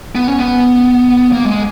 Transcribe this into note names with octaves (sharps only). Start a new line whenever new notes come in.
B3
C#4
B3
A#3
G#3